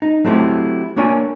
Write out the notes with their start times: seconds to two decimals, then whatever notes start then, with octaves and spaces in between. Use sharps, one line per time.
0.02 D#4
0.25 F#3 A3 C4 E4 G4
0.96 A#3 D4 A#4 C#5 D5 G#5